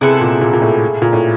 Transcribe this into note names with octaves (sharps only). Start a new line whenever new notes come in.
C3 G#3 B3 E4 A4
A#2
A#2
A#2
A2
A#2
A2